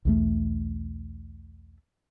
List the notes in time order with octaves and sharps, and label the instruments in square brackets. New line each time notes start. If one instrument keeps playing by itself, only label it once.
[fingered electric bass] B1 E2 A3